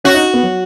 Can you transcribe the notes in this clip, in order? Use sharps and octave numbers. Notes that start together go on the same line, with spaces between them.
C#4 F#4
D#4
B3
F#3